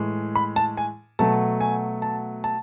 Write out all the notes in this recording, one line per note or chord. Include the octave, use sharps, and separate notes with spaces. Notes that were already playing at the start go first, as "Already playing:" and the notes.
Already playing: A2 E3 G#3
B5
A5
G#5
B2 F#3 A3 A5
G#5
A5
A5